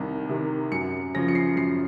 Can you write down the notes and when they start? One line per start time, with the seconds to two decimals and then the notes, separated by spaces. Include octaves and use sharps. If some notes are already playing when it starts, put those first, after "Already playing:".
Already playing: C2 C3 D#3
0.29 C3 D#3
0.72 F#2 C#7
1.14 C#3 F3 A#6
1.28 C#7
1.35 C7
1.56 F#2 C7